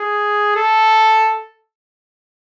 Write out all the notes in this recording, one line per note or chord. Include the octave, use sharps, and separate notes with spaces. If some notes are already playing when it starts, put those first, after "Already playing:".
Already playing: G#4
A4